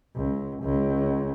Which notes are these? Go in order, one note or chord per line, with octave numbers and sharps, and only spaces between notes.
C#2
C#2